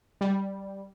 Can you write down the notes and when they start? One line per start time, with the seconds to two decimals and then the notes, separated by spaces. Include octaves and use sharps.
0.21 G3